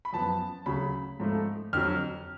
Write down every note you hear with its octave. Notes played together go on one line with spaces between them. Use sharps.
B5
F#2 F3 B3 A5
D2 C#3 F#3 B5
G#2 F3 A3
F2 D3 F#3 F6